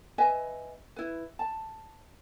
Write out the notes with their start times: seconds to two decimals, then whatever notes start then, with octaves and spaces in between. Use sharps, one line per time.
0.18 B4 D#5 E5 G#5
0.96 E4 B4
1.39 A5